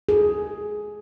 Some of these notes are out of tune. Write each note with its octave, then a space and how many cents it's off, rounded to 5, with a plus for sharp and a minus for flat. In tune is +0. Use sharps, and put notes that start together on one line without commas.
G#4 +10